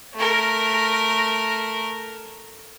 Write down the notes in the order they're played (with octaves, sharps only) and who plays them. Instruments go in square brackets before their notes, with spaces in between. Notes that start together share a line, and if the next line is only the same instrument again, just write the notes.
[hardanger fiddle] A3 A#4